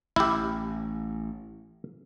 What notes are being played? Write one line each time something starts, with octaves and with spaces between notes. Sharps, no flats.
A1 E4 G4